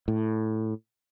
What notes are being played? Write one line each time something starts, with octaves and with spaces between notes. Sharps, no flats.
A2